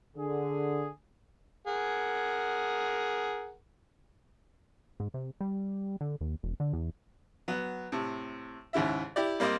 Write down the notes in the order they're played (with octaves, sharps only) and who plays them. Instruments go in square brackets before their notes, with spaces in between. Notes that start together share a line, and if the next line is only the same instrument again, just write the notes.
[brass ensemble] D3 G#4
[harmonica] G#4 A#4 F#5
[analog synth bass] G#2
C3
G3
D3
D#2
E1
D3
E2
[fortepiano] F#3 B3
A2 C3
D#2 G#2 C#3 E4 E5
E4 G4 D5
G3 A#3 C4 C5 D#5